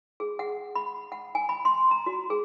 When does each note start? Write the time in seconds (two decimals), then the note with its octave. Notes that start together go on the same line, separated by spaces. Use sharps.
0.20 G#4
0.39 F#5
0.75 B5
1.12 F#5
1.35 G#5
1.49 B5
1.65 C6
1.91 A#5
2.06 F#4
2.30 G#4